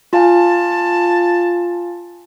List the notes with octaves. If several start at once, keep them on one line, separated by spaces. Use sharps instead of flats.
F4 F5 G#5 A5